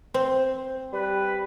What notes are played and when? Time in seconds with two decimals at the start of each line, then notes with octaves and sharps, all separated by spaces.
0.14 C4 C5
0.93 G3 B4